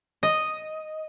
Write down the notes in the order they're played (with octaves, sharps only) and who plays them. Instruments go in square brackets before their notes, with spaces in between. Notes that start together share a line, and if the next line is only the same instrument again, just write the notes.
[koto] D#5